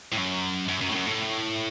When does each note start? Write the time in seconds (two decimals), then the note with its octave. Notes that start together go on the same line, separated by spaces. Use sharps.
0.12 A2
0.17 F#2
0.68 F#2
0.81 F#2
0.88 A2
0.94 F#2
1.06 A2